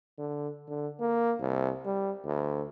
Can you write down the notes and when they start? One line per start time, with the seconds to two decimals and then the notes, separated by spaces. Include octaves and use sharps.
0.19 D3
0.68 D3
1.00 A#3
1.40 C2
1.86 G3
2.25 D2